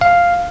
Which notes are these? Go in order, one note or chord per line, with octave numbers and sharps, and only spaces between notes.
F5